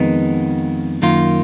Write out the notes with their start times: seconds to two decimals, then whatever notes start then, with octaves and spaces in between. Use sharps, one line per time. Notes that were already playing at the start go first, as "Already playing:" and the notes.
Already playing: F2 D#3 G#3 B3 D#4
1.02 F#2 D#3 A#3 F4